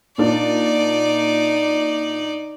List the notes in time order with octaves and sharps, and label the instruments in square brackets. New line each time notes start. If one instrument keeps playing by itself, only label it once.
[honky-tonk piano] A#2 D4 [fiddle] D#4 D5